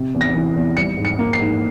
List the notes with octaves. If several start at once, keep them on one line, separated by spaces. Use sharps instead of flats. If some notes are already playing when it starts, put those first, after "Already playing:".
Already playing: C3
E2
A#6
E3
E2
G3 C#7
G#2
C#7
A#3
C7
G#2